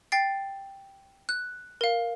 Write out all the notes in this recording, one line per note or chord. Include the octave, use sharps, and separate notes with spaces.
G5 A6 C7
F#6
A#4 F5